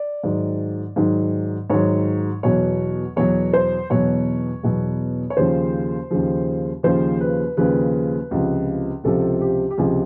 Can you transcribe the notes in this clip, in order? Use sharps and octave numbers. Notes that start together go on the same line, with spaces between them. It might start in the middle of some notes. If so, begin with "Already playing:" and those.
Already playing: D5
G#2 D#3 F#3
G#2 D#3 F#3
G#2 D#3 F#3 C#5
E2 B2 F#3 C#5
E2 B2 F#3 C#5
C5
E2 B2 F#3 C#5
E2 B2 F#3
C#5
D#2 C#3 F3 C5
D#2 C#3 F3
D#2 C#3 F3 C5
B4
D#2 C#3 F3 B4
C#2 C3 F3
C#2 C3 F3 A4
G4
G4
C#2 C3 F3 G#4